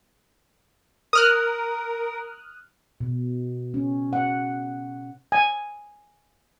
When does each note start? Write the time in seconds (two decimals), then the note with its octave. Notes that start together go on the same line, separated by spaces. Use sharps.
1.13 A#4 D#6 F6 F#6
3.00 B2
3.74 C#4
4.13 F#5
5.32 G#5